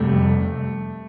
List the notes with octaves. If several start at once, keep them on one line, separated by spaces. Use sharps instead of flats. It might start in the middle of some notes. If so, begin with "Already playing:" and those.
Already playing: F2 C3 G3 A3